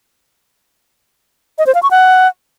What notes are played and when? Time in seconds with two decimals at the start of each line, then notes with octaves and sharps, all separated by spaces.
1.58 D#5
1.67 C5
1.75 F5
1.83 C#6
1.91 F#5